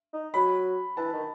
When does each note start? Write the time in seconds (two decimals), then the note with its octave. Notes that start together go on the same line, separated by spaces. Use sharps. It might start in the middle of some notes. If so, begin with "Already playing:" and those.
0.13 D#4
0.34 F#3 B5
0.97 E3 A5
1.13 D#3